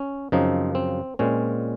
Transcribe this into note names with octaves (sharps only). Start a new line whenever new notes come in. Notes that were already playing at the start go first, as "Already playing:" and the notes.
Already playing: C#4
F#2 C#3 F3 C4 D#4
C4
A#2 G#3 C4 C#4